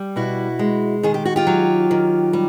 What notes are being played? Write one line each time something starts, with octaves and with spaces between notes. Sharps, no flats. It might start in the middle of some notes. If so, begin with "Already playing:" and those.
Already playing: G3
B2 E4 F#4
G#3
D#3 G#4
G4
F#4
F4 G4
F#3
D#3
G3